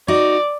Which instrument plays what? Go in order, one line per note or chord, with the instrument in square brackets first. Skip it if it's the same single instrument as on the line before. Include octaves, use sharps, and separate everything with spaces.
[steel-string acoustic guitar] D#4 F#4 [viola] D5